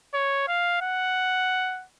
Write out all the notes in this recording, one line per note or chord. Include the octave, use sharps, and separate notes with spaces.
C#5
F5
F#5